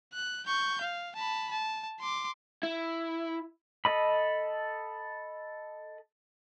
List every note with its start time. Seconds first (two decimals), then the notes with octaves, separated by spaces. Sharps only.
0.13 F#6
0.46 C#6 G6
0.81 F5
1.16 A5 B5
1.51 A5
2.00 C6 D6
2.63 E4
3.85 A4 D#5 B5